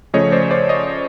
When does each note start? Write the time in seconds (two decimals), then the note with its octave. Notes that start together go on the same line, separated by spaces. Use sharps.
0.14 C#3 F3 A3 C#5 D#5
0.32 C5 D5
0.51 C5 D5
0.69 C#5 D#5